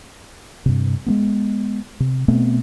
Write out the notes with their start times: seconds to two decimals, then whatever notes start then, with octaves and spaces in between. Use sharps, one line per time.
0.66 G2 C3
1.06 G#3 A#3 B3
2.00 C3
2.28 B2 A3 B3 C4